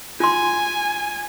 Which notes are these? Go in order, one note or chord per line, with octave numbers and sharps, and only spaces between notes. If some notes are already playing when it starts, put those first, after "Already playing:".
F4 G#5 C6